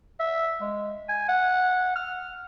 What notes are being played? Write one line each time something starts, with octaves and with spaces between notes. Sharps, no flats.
E5
G#3
G#5
F#5
F6